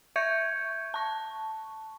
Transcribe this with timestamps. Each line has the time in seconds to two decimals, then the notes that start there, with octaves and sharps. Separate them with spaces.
0.16 E5 C#6 G6 G#6 C#7
0.94 A5 C#6